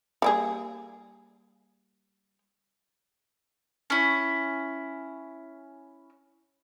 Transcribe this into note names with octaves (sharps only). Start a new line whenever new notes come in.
G3 A#3 G#4
C#4 E4